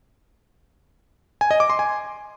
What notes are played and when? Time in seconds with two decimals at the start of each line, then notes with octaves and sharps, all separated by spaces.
1.41 G#5
1.51 D#5
1.60 D6
1.70 C6
1.79 G#5